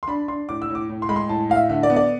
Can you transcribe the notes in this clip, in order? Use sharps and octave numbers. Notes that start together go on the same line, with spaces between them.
C6
D4 B5
D4 C6
A2 D6
E6
A2
D6
A2
C6
G#3 B5
C6
A2 A5
A2 F5
E5
D3 E5
D5
B3
D5